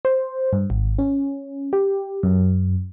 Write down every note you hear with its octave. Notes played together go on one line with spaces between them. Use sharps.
C5
G2
G#1
C#4
G4
F#2